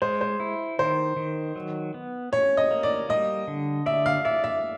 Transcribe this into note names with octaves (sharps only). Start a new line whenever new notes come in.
G#3 C5
C5
E4
D#3 C5
D#3
F#3
B3
C#4 C#5
D#5
A#3
D5
G3 D#5
D3
D5 E5
F5
D5 E5
E5